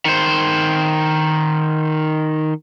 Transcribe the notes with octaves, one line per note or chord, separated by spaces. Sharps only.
D#3 C5